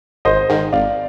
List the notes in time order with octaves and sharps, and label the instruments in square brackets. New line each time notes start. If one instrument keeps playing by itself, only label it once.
[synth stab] G#1 [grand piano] C5 D#5
[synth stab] G#2 D#3
[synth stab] G#1 [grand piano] D5 F5